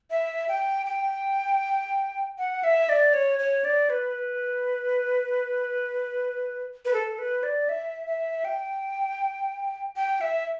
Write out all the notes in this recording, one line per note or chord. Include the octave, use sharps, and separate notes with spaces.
E5
G5
G5
F#5
E5
D5
C#5
C#5
D5
B4
B4
A4
B4
D5
E5
E5
G5
G5
E5